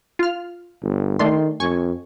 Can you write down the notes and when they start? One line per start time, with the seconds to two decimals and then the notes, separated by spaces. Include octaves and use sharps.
0.19 F4 F6
0.82 G1
1.19 D#3 A3 D4 C6
1.60 F2 G#5 C#6